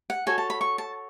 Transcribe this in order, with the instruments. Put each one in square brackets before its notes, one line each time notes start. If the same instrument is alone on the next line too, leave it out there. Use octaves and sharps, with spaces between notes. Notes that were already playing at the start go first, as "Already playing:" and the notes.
[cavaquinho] F#5
F#4 A4 C#5 G#5
A5
B5
C#6
A5